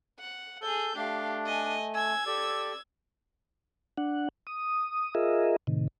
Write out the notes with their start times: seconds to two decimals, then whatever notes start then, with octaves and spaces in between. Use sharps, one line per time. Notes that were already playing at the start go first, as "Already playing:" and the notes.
0.20 F#5
0.62 G#4 A4 G6
0.96 A3 D4 G4 F5
1.45 D#5 G#5
1.95 G#5 E6 G#6
2.27 G4 A4 D5
3.98 D4 F#5
4.47 D#6
5.15 F4 G#4 A#4 D#5 E5
5.67 A2 C3 D#3